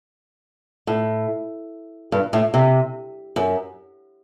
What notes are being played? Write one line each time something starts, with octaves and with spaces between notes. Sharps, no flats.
A2
G2
A2
C3
F#2